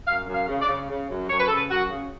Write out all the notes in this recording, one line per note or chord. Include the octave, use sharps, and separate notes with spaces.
F#2 F5
F#2
F5
C#3
D5
C#3
C#3
F#2
F#2 C#5
B4
C#3 A4
B4
F#2 F#4
C#3